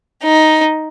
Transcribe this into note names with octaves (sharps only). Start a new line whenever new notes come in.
D#4